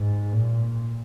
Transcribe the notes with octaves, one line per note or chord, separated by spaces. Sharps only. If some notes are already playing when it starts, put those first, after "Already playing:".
Already playing: G#2
A#2